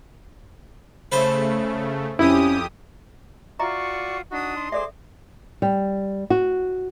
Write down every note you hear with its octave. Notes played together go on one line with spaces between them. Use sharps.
C#3 A3 B4 C5 A5
F2 C#4 E4 G4 D#6
F4 F#4 D5 E5 A#5 C#6
D4 D#4 F#4 D#6
C6
G#4 A4 C5 D5 E5 D6
G3
F#4